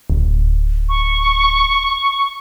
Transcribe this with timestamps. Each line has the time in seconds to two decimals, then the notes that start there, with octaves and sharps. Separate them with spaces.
0.10 D1
0.89 C#6